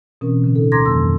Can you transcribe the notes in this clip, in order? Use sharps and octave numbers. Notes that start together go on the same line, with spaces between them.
B2 E3 C4 C#4 A#4
A2 D3 C#4
D#4 A4
D2 A#5 C6 D6 G#6 A#6
F2 D#3 F#3 A#3 C6 E6